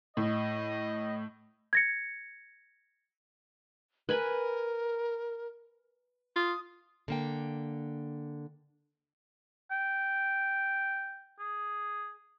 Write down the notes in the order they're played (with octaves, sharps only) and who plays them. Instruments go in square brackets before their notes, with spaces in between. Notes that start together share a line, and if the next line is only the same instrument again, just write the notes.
[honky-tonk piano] A2 [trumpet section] D#5
[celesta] G#6 A#6 C#7
[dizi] A#4 [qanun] B4 G#5 B5
[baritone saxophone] F4 [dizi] D#6
[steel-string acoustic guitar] D3 A#3 G5
[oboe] G5
G#4